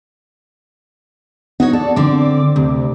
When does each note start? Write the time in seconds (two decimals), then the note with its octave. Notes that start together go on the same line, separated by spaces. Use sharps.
1.60 B3 D#4 F#4 C#5
1.73 A4 D5
1.96 D3 C4 D6
2.56 D2 C3